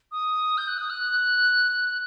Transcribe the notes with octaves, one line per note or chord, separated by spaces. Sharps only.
D#6
G6
F#6
D#6
F#6